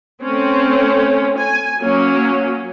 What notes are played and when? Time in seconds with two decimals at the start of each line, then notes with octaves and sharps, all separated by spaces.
0.22 A3 C4 C#4
1.38 G#5
1.80 F#3 A#3 C#4